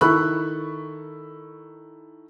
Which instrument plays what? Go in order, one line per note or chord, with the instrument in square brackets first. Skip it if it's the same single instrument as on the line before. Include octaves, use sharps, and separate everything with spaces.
[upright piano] D#3 E4 A4 B5 C#6 F#6